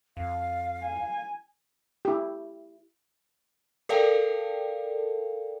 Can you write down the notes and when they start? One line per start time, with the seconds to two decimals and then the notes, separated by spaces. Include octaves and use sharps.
0.17 F2 F5
0.84 G#5
2.05 E4 G4
3.89 A4 A#4 D5 F5 G5 A5